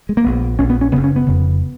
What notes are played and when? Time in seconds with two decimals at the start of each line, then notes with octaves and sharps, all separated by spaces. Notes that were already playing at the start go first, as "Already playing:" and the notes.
0.09 G#3
0.17 A#3
0.24 A#1 A#2 B3
0.59 A#1 A#2 C#4
0.70 B3
0.81 C#4
0.92 F#1 F#2 C#3 B3
1.04 C#4
1.16 B3
1.26 F1 F2 C#3